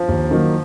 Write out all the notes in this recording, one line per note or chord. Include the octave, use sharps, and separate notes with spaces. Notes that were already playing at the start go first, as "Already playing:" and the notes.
Already playing: F3
D#2
D#3 F#3 A#3